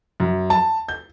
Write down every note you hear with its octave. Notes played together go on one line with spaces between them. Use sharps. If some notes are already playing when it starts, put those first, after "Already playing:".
F#2
A5
G6